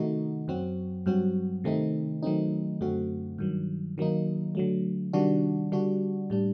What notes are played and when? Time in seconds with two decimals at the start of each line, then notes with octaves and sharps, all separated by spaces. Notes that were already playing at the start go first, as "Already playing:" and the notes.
Already playing: C3 D#3 A3 D#4 F#4
0.48 F#2 F#3 C4 F#4
1.06 G2 F#3 C4 F#4
1.64 C3 D#3 A3 C4 D#4
2.23 D#3 F#3 A3 C4 D#4
2.81 F#2 D3 A3 C4 F#4
3.39 G2 D#3 F#3
3.98 D#3 F#3 A#3 D#4
4.55 D3 F#3 A3
5.13 C3 D#3 G3 D4 F#4
5.72 D3 G3 D4 F#4
6.30 A2 G3 D4